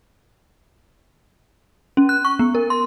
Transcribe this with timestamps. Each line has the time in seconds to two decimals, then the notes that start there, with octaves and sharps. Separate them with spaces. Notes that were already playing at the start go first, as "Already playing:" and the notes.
1.97 C#4
2.09 F#6
2.25 C#6
2.39 B3
2.55 A#4
2.70 C6